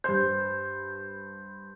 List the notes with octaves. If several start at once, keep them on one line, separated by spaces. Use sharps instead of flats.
G2 C5 G6